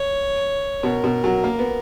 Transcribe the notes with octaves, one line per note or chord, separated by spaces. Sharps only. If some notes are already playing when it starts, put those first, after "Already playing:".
Already playing: C#5
B2 A#4
B2
F#3
A#3
B3